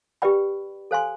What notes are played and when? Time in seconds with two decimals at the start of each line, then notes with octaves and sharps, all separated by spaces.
0.22 G4 B4 D5 G5 B5
0.91 A4 C5 F5 G#5 C6